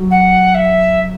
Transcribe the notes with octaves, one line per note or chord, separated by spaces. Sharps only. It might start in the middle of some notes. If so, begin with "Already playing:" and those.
Already playing: F#3
F#5
E5